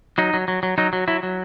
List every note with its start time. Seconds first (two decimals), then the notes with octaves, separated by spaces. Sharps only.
0.18 F#3 D#4
0.34 F#3
0.48 F#3
0.63 F#3
0.78 F#3 D#4
0.93 F#3
1.08 F#3 E4
1.23 F#3